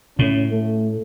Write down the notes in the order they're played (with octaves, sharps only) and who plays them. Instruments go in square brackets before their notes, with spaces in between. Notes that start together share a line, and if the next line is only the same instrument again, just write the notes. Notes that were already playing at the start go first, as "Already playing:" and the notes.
[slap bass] A2 [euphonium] C#4
[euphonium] A3